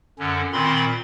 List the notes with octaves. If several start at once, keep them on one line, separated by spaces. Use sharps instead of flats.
F#2 D3 C#4
A#2 D#3 C4 B5 C6